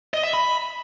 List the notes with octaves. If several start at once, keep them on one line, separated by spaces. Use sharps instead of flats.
D#5
E5
B5